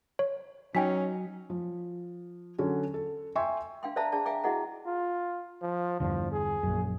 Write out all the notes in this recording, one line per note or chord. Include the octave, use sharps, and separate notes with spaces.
C#5
F#3 C#4 D#4 G5 G#5 B6
F3
D3 F#3 C#4
A4
E5 G5 G#5 C6 C#6
D4 F5 G5 C6
C5 D5 E5 F5 A5 A#5
D4 G#4 D5 A5
E5 F5 G5 G#5 A#5 D6
E4 F#4 G#4 D#5 F#5 A#5
F4
F3
E2 G2 D3 F3
G#4
A#1 F#2